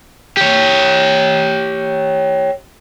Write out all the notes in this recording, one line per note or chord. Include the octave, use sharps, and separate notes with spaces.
G4 C#5